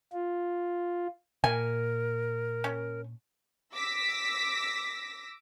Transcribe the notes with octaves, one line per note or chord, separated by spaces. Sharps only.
F4
A#2 A#4 G#5
C#4
D6 E6 A#6 B6